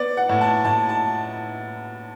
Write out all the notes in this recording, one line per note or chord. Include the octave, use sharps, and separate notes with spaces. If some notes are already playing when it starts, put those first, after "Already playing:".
Already playing: B3 D5
F#5
A2
A5
A2 A5
A5